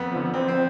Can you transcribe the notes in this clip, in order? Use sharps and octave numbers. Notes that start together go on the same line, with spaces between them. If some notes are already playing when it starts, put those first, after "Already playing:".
Already playing: F2 B3
D3 F3
F2 C4
C4